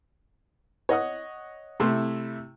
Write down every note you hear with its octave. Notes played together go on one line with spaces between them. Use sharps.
C#5 D#5 F#5 D#6
C3 A3 E4 C6